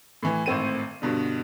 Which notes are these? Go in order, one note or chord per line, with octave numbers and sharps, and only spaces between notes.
A2 E3
G#1 A2 C4 D#7
G2 B2 D3